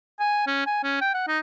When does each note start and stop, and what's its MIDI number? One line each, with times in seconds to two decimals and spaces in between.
0.19 0.45 80
0.47 0.62 61
0.66 0.82 80
0.83 1.00 61
1.01 1.11 79
1.14 1.26 78
1.27 1.39 63